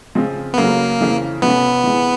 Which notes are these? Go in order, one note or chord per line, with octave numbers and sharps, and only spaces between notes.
C#3 F3 G#3 C4
B3
C#3 F#3 A3 A#3
F2 C#3 E3 A3
C3 F3 A3 B3 C#4
E3 G#3 C4 E4